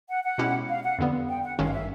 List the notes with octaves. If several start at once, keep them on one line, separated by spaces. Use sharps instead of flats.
F#5
F#5
B2 G#3 C#4 E4 G4
F5
F#5
F2 D3 G3 B3
G5
F#5
G#1 G2 D#3 G#3 C#4 F5
E5